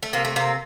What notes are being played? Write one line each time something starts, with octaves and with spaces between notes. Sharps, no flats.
A3
C3 A#3
A3
C3 A#3